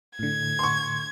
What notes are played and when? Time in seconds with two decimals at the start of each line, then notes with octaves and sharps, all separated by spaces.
0.19 A2 D3 G#6
0.59 C6 C#6